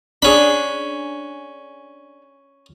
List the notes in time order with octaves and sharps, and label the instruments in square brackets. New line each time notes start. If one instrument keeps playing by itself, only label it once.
[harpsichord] C#4 B5 [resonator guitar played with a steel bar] D4 G#4